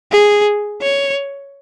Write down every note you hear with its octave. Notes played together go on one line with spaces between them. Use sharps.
G#4
C#5